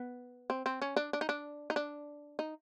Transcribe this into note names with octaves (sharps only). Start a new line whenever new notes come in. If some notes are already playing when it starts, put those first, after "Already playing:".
Already playing: B3
C4
C4
C#4
D4
D4
D#4
D4
D#4
D4
D#4